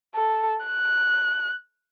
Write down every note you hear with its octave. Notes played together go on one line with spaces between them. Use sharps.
A4
F#6